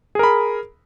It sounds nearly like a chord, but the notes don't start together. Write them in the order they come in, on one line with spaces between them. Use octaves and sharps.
G#4 A#4 B5